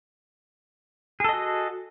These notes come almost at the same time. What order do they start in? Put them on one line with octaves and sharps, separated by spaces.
G#4 A4 D#5 F#4